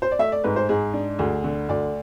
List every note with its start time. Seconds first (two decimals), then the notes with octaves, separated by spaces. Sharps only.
0.02 C5
0.11 D5
0.19 A3 E5
0.32 D5
0.44 G#2 B4
0.56 C5
0.69 G#2 G#4
0.94 D4
1.19 D2 G#4
1.44 D3
1.69 D2 D5